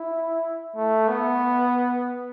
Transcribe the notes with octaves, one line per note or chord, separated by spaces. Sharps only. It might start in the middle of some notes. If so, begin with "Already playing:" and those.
Already playing: E4
A3
B3